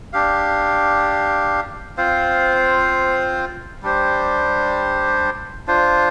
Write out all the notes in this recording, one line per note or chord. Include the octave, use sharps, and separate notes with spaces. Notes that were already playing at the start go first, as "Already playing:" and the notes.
D4 G4 F5
C4 F4 C5 F5
G3 D4 G4 C5
D4 F4 C5